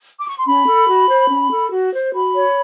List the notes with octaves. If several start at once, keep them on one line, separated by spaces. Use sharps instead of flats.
D6
C#6
C6
C#4 B5
A4
F#4
C5
C#4
A4
F#4
C5
F#4 B5
C#5